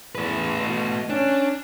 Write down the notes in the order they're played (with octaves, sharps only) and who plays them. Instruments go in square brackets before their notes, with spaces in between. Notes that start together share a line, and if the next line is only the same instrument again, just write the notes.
[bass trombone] E2 [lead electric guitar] A3 B4
[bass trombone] B2
[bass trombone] C#4 [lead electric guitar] D4